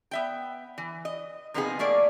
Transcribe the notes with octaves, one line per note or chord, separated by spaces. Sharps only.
B3 E5 G5
E3
D#5
C3 F3 A#3 B3 D#4 G#4
A3 A#3 G#4 D5